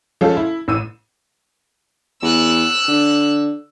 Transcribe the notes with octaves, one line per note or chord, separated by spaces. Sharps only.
F3 G#3 C#4 A4 F5
E4
A1 E6 D#7
E2 E6 F#6
D3